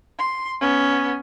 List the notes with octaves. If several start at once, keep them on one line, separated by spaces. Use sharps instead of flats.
C6
B3 C#4